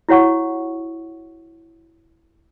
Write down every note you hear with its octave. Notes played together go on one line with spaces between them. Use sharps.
E4 F#4 C#5 F#5 C#6